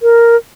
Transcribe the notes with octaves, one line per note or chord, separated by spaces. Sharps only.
A#4